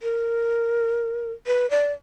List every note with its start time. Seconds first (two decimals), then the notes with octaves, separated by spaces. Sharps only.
0.02 A#4
1.47 B4
1.70 D5